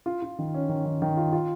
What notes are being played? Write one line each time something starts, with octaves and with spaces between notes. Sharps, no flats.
F4
F4
D#3
C#4
D#3
D#3
D#3
F4
F4